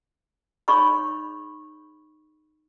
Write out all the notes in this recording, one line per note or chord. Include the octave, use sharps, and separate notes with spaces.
D#4 G#4 C#5 B5 C#6